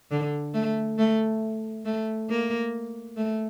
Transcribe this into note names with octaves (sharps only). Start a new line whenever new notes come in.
D3
A3
A3
A3
A#3
A3